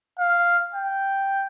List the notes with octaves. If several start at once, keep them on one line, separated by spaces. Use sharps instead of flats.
F5
G5